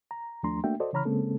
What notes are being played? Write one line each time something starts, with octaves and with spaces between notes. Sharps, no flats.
A#5
D#2 F3 A3 D4 A#5 C6
A3 A#3 D4 F#4 E5 G5
F#4 A4 C5 D5 D#5
C#3 E3 C#5 A#5 B5 F6
C#3 G#3 A#3 C4 C#4 A4